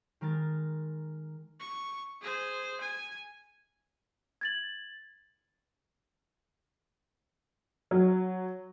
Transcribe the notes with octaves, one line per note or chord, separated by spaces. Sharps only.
D#3 G#3 A#4 A6
C#6
G#4 C5
G#5
G#6 A6 F#7
F#3